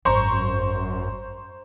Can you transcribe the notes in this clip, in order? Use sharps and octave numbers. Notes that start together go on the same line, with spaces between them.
G#1 F#2 C4 C5 A#5 C#6